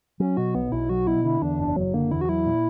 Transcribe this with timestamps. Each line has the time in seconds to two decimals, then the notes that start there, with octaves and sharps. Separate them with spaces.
0.20 F#3 C#4
0.37 B2 F#4
0.55 B1 B3
0.72 B1 E4
0.89 F#3 F#4
1.07 B2 E4
1.24 D3 E4
1.42 E2 D4
1.59 F#1 D4
1.76 F#1 F#3
1.94 D3 A#3
2.11 E2 E4
2.21 F#4
2.29 F#3 E4
2.46 A#2